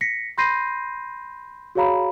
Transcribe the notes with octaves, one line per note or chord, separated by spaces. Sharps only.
A#6 B6 C#7
B5 C6 G6 A#6 C7 D#7
F#4 G#4 C#5 F5 A#5 B5